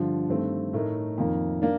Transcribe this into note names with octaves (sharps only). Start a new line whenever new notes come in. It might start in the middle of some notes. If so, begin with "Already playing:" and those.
Already playing: G2 D3 F3
G2 D#3 A3 C4
A2 A3 D#4 A#4
F2 D#3 A#3
A#3 D4